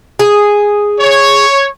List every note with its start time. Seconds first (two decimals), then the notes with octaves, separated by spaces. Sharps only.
0.19 G#4
1.00 C#5